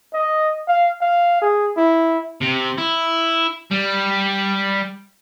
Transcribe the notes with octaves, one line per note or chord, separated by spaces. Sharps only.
D#5
F5
F5
G#4
E4
C3
E4
G3